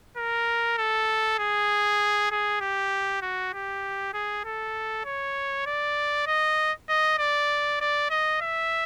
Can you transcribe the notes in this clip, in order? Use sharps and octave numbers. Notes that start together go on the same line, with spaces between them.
A#4
A4
G#4
G#4
G4
F#4
G4
G#4
A4
C#5
D5
D#5
D#5
D5
D5
D#5
E5